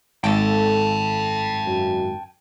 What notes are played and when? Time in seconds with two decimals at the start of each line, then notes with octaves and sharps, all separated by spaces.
0.24 G#1 A4 G5 A5
1.64 F#2